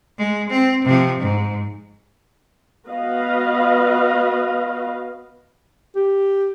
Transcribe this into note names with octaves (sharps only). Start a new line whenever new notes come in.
G#3
C4
C3 F3
G#2
B3 F#4 B4 D#5 F5
G4